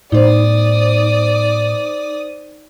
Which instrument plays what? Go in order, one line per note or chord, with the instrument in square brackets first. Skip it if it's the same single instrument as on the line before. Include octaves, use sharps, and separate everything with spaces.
[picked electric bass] A2 B3 [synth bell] D#4 C5 [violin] D5 D#6